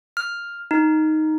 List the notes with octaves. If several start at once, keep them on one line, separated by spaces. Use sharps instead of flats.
F6
D#4